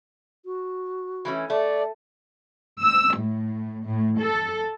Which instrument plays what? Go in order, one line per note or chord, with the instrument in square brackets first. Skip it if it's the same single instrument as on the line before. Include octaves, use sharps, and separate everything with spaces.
[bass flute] F#4
[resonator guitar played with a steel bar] E3 A3 C#4
[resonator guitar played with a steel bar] A3 [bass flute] D5
[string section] E6
A2
A2
A4